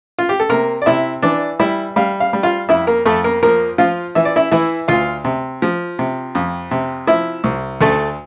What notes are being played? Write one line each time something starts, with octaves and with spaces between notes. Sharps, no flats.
F4
G4
A4
C3 A#3 A#4
D5
C3 E4 E5
E3 D4 D5
G3 E4 E5
G3 F5
F5
G3
F4 F5
F2 E4 E5
A#3 A#4
F2 A3 A4
A#3 A#4
F3 A#3 A#4
F3 F4 F5
E3 E5
D5
E4 E5
E3 E4 E5
D2 F4 F5
C3
F3
C3
F2
C3
F3 E4 E5
C2
D2 A3 A4